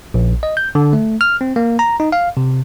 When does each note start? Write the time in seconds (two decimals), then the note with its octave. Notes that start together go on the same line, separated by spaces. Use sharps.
0.14 A#1
0.43 D#5
0.57 G6
0.75 D3
0.93 A3
1.21 F6
1.41 C4
1.56 A#3
1.79 A#5
2.00 D#4
2.12 F5
2.37 C3